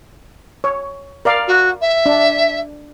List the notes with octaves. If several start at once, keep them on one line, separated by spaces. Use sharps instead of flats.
C#5
A#4 D5 F5
F#4
E5
D4